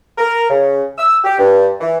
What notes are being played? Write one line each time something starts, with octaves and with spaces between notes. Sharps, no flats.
A#4
C#3
E6
G4
G2
E3